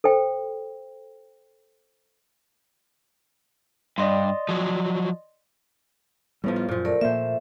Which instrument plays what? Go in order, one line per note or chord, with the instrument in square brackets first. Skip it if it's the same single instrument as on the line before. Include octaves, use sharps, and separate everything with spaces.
[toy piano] A4 C5 G5
[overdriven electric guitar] G2 [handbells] D5 D#5 C6
[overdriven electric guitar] F3 F#3
[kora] A2 F3 [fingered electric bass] G3 B3
[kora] F4
[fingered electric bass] F#2 [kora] A#2 F3
[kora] A3 [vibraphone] A#4 D5
[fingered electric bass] A#2 A#3 [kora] F3 C5 [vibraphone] E5